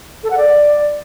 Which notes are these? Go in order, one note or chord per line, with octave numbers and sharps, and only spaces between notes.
A4
F#5
D5